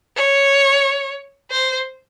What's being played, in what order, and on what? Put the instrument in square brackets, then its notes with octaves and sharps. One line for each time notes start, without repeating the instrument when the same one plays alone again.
[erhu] C#5
C5